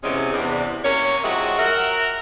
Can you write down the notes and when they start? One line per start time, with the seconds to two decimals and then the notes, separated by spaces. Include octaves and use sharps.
0.04 E2 C3 G#3 C4 C#4
0.33 E2 C3 D4
0.85 C3 A#3 C#4 C#5
1.24 G#2 F3 G#3 F#4 G4 E5
1.59 F#4 A#4 E5